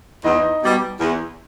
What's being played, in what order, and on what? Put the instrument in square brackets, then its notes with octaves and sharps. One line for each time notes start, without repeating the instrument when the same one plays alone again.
[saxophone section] E2 [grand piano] D#4 D#5
[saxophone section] B2 G3
E2